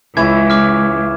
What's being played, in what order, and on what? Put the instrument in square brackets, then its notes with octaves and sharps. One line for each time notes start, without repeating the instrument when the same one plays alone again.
[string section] C#2 [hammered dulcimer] E3 E4 C#5 [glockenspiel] G#6
[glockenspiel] D6 F6